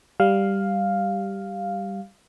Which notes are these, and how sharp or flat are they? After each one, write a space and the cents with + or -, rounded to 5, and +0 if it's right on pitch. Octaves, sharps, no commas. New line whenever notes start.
G3 +0 F5 +0